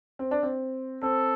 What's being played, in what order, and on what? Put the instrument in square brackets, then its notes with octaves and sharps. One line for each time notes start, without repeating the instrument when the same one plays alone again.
[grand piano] C4
D4
C4
[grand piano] C4 [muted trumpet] A4